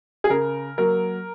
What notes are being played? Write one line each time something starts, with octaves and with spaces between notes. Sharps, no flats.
G#4
C#3 A#4
F#3 A#3 A#4